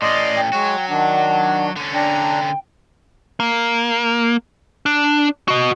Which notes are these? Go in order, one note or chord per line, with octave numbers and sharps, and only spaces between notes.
A2 C#4 D5 D#5 C6
G5
F#3 G#3 F#4 C#5
D#3 D4 F#5
D3 C#4
D4 G5 A#5
A#3
D4
F#4 D#5